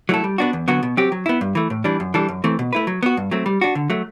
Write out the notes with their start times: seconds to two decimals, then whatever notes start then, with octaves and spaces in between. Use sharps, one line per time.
0.09 F#3 A3 E4 A4
0.24 G3
0.38 B3 D4 F#4
0.53 E2
0.68 D3 F#3 B3 F#4
0.83 B2
0.97 F#3 C4 G4
1.12 F#3
1.26 B3 E4
1.41 G2
1.55 E3 A3
1.70 A2
1.84 E3 G3 D4
2.00 F#2
2.14 E3 G3 D4 A4
2.29 F#2
2.44 E3 A3 C4
2.59 B2
2.73 A3 E4 B4
2.87 F#3
3.03 B3 F#4
3.17 G2
3.31 F#3 A3 C4
3.46 G3
3.61 D4 F#4
3.75 D3
3.90 F#3 A3